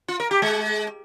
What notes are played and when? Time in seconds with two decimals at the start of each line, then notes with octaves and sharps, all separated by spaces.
0.08 F4
0.20 A#4
0.31 G4
0.42 G#3